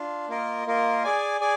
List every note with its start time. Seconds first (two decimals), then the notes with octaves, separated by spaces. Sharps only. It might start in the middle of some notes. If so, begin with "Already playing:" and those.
Already playing: D4 F4
0.28 A#3 F4 A#4 D#5
0.66 A#3 F4 A#4 D#5
1.04 G#4 D5 G#5
1.41 G#4 D5 G#5